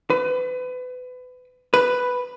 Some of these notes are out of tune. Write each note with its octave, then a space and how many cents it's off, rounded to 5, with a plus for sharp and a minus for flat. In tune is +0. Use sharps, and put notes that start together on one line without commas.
B4 +30
B4 +5